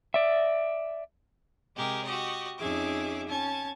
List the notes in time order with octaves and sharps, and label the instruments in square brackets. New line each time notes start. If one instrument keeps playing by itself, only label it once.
[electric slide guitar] D5 E5
[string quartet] C3 G#3 G4 G#4 A#4
F#4 G4 D#5
F2 C#4 D#4 G#4 E5 D6
C#4 A5 G#6